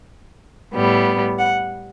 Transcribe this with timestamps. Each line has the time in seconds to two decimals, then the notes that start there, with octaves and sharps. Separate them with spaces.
0.74 A2 G3 B3
1.40 F#5